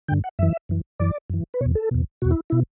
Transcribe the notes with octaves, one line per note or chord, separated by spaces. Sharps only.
G2 D3 G5
F#5
F#2 E3 E5
F#2 E3
F#2 E3 D5
F#2 E3
B4
E2 B2 C#5
A4
E2 B2
E2 B2 F#4
E4
B2 E4